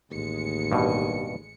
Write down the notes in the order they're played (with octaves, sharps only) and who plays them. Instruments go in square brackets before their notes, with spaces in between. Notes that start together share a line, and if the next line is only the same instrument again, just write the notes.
[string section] A1 G#3 C#7 [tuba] D#2
[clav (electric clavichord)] G2 B2